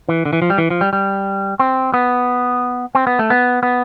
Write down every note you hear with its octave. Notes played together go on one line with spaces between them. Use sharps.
E3
D3
E3
F3
G3
E3
F3
G3
G3
C4
B3
C4
B3
A3
B3
B3